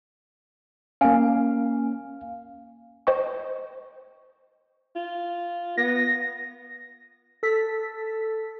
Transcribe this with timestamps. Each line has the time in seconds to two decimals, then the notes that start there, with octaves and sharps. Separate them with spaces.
1.01 A#3 C#4 F5 G#5
3.07 C5 D#5 G5 C#6
4.96 F4
5.77 B3 A#6
7.43 A4 B6